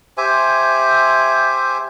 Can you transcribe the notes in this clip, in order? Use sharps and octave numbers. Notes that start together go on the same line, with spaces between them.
G4 C5 E5 G#5